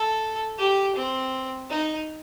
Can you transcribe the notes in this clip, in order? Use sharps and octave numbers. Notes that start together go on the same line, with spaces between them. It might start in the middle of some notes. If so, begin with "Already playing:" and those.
Already playing: A4
G4
C4
D#4